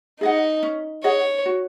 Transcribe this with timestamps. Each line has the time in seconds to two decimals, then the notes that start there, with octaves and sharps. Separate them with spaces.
0.21 D#4 G#4 D#5 F#5
0.63 C#4
1.04 G#4 C#5 D#5 F#5
1.46 F#4